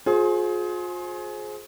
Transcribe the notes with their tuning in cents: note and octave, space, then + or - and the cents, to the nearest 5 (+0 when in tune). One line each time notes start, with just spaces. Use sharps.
F4 +40 G#4 +25 C5 +15